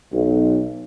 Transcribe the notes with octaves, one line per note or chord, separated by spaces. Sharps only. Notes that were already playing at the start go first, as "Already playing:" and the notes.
B1